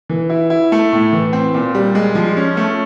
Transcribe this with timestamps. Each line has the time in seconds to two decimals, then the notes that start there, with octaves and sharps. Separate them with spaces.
0.10 E3
0.30 E4
0.50 E4
0.72 A3
0.92 A2
1.13 E3
1.33 C4
1.54 A#2
1.75 G3
1.95 G#3
2.15 F3
2.37 C#4
2.57 A3